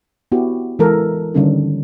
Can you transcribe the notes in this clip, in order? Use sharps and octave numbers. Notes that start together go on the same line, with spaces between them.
B3 E4 F#4 G4
E3 G#3 A4 A#4
D3 D#3 G3 C#4 D#4 A4